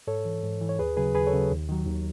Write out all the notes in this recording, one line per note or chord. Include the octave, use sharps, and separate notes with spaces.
G#2 A4 C#5
E3
G#2
E3
C#5
D#2 G#4 B4
C#3 F#3 G#4 B4
D#2 G#4 B4
A4 C#5
C#3 F#3
D#2
D#3 F#3
D#2